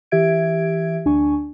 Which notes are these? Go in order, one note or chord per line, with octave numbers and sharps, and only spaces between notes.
E3 G4 E5 G#6 D7
D2 D4 G#5 C#6